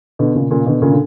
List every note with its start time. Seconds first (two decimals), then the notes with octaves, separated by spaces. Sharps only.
0.19 B2 D3
0.35 A#2 C#3
0.50 A#2 C#3
0.66 B2 D3
0.82 A#2 C#3
0.91 D3